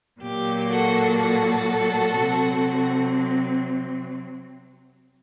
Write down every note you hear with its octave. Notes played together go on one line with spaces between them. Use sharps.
A#2 F#3 A#3 G4
F#4 A4
F#4 A4
C3 F#3 C4